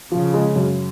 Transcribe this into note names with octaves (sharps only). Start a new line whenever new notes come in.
C#3 F3
G#3
F#2